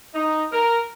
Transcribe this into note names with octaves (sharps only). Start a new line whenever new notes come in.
D#4
A#4